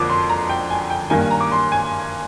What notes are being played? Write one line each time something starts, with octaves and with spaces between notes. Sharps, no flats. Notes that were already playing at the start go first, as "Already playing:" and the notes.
Already playing: F2 D3 F3 A#3 D6
C6
A#5
G5
G#5
G5
G2 D#3 A#3 G#5
A#5
D6
C6
G#5